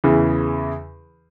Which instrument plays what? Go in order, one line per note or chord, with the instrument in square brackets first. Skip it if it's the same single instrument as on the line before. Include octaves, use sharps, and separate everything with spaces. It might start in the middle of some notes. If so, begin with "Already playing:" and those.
[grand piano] E2 C#3 E3